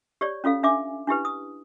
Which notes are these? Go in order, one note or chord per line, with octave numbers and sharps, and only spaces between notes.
G4 C#5 D5
C#4 F4 A4 F5
D4 E5 G#5 D6
D4 E4 G4 B4
D#6